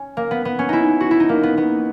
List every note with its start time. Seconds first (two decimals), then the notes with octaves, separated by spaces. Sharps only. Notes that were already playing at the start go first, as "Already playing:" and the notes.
Already playing: C#4
0.17 A#3
0.31 B3
0.45 B3
0.59 C#4
0.69 D#4 E4
1.01 F#4
1.11 E4
1.20 D#4
1.29 A#3
1.43 B3
1.57 B3